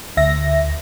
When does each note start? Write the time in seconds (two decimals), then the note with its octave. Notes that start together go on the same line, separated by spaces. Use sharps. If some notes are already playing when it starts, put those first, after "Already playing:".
0.17 D2 E5 A#6